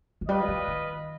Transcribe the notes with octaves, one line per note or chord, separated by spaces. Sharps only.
F3
G3 F4 B4 D#5
F3
D#3